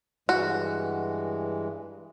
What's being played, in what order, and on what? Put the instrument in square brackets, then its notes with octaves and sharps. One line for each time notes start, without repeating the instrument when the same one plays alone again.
[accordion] G2 E3 G#3 [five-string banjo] F#4